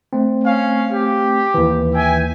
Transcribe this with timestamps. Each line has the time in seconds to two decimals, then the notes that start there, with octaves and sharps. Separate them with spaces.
0.13 A3 C4
0.44 C#4 F5
0.91 G4
1.54 D#2 E3
1.94 E5 G5 G#5